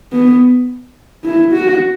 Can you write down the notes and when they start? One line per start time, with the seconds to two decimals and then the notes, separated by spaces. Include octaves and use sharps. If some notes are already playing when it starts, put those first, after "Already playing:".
0.12 B3
1.25 E4
1.53 F#4